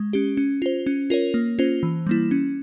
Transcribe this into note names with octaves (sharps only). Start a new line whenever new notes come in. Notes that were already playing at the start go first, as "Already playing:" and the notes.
Already playing: G#3
C#4 G4
C#4
F4 C5
C#4
F4 A#4 C#5
A#3
C#4 F4 C5
E3
G3 A#3 E4
C#4